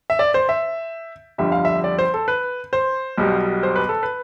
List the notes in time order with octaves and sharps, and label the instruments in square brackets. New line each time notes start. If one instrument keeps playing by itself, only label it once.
[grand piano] E5
D5
C5
E5
G1 F2 D3 G3 E5
F5
E5
D5
C5
A4
B4
C5
B1 B2 G3
C5
B4
A4
B4